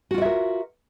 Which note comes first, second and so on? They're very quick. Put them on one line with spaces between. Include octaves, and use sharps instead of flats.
F#4 F4 D5 E5 A#4